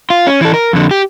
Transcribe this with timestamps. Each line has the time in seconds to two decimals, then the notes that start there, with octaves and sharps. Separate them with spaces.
0.10 F4
0.27 C#4
0.41 E3 A4
0.54 A#4
0.73 F2 D3
0.91 G4